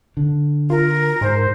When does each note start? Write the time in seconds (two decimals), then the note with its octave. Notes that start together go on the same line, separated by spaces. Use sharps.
0.17 D3
0.70 F4 A#4
1.21 G#2 C5